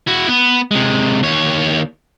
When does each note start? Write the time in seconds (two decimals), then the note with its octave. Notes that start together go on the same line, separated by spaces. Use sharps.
0.07 E4 F#4
0.28 B3
0.71 C3 G#3
1.23 D#2 C#5